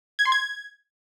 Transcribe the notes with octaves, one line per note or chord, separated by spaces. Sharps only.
G#6
C6
G#6